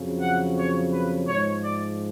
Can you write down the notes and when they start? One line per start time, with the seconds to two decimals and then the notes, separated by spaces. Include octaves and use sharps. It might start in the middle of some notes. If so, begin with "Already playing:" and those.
Already playing: F2 C#3 F#3
0.21 F#5
0.56 C#5
0.92 B4
1.27 G#2 F3 G#3 C#5
1.63 D5